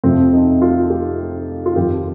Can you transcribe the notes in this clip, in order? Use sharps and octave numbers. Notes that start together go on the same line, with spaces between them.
F2 C3 F3 C4
D#4
F4
G4
F4
F2 D#3 G4